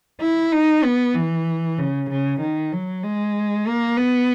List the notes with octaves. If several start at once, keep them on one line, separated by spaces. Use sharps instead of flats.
E4
D#4
B3
E3
C#3
C#3
D#3
F#3
G#3
A#3
B3